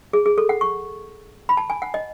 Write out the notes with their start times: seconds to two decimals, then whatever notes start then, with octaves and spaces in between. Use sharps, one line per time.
0.13 G#4
0.26 G#4
0.38 A4
0.49 F#5
0.61 C#6
1.49 B5
1.57 A5
1.70 G#5
1.82 F#5
1.94 D#5